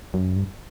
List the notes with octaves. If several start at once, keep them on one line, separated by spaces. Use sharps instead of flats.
F#2
G2